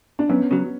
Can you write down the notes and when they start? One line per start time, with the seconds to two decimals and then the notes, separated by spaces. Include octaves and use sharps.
0.19 D4
0.29 F#2 B3 C#4
0.51 C#3 F#3